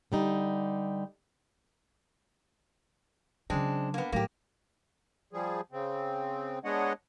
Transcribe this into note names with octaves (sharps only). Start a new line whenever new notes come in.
D3 G3 D#4
C#3 F#3 G#3 C4 D4
A#3 B3
A2 F#3 A#3 G4
F3 G3 G#4
C#3 C4
G#3 B3 D4 C#5 D#5 F#5